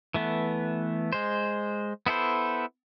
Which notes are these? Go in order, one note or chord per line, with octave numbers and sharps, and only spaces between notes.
E3 A3 B3
G#3 C5
B3 E4 A4 C5